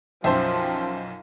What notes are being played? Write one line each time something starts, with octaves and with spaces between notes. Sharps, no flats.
B1 F#2 F3 C5 E5 G5 A5 C6